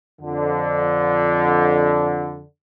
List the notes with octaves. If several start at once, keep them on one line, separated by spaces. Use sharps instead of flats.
F2 D3